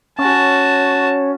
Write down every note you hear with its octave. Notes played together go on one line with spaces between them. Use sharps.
C#4 F#4 A5